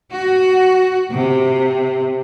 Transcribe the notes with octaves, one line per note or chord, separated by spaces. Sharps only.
F#4
C3